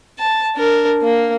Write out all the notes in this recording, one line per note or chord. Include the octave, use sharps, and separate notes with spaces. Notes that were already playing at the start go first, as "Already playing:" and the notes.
A5
D4 A#4
A#3